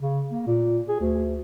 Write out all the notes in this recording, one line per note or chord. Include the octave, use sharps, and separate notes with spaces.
C#3
A#3
A#2
G#4
D2